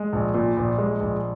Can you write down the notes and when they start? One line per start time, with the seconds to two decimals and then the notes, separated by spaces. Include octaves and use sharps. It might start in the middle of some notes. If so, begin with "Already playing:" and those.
Already playing: G#3
0.13 A#1
0.34 A#2
0.57 A#1
0.78 G#3
1.00 A#1